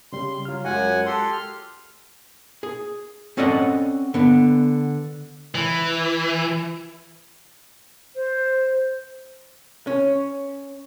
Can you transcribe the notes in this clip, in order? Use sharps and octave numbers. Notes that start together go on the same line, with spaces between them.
C#3 G3 C6
F#3 F4 F6
F#2 G#3 F4 F#4 F#5 G#5
G4 A4 C6
F6
G#4
C4 C#4 A4 D5 D#5 F#5
D3 B3
E3
C5
C#4